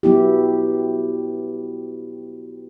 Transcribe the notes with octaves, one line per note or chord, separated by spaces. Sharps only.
F#3 B3 E4 G4